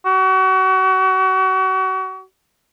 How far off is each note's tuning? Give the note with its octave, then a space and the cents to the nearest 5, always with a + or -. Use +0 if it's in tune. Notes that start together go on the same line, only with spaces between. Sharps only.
F#4 +35